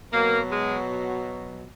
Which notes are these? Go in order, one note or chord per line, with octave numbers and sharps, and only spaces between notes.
B2 F#3 A#3
G#3